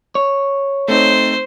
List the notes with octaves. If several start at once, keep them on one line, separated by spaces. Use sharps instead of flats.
C#5
A3 C4 D#4 C5